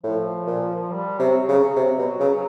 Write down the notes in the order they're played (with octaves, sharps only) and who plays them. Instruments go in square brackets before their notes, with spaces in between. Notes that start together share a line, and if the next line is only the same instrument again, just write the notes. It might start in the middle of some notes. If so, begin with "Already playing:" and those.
[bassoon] A2 [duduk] F3
[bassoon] A#2
[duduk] G3
[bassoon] C3 [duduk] F#3
[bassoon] C#3 [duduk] F#3
[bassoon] C3
B2
C#3